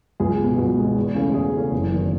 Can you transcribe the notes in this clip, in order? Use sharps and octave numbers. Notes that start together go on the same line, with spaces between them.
C#2 G#4
B2 G#3 B3
C#2 F#4
B2 G#3 B3
E2
C#3 E3 A3 C#4
E2 G#4
C#3 E3 A3 C#4
F#1
E2 D#3